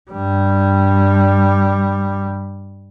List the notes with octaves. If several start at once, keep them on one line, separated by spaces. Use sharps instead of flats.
G2 G3